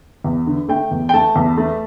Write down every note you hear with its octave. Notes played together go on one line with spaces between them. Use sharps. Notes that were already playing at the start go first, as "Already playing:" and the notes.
E2
D3
A3 G5
E2
G5
A3 A5
E2
A3